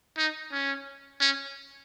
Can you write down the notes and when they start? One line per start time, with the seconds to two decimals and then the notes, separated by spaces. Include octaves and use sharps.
0.17 D#4
0.52 C#4
1.20 C#4